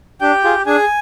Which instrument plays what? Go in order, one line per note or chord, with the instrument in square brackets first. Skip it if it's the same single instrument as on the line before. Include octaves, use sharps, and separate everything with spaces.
[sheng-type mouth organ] D4 G4 G5
F4 G#4
D4 G#4 G#5